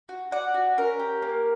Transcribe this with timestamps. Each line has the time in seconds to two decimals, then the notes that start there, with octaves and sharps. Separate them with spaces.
0.09 F#4
0.31 F#4 D5 F#5
0.54 F#4
0.77 C#4 A#4
0.99 G4
1.22 A#3